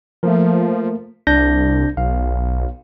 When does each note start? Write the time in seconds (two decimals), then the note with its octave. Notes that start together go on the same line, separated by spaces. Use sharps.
0.23 F3 A3 A#3 A#4
1.27 C2 D4 G6 A#6
1.97 B1 F5